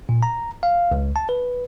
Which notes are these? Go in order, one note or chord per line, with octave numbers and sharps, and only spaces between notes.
A#2
A#5
F5
C#2
A5
B4